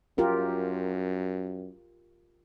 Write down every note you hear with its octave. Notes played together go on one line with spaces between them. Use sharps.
F#2 F4 G4 A#4